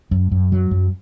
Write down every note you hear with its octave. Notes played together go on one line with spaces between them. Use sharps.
F#2
F#2
F#3
F#2